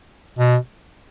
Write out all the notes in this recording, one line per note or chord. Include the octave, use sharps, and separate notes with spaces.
B2